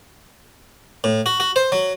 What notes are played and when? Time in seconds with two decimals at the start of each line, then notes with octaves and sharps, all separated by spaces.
1.04 A2
1.26 F#4
1.40 F#4
1.56 C5
1.72 F#3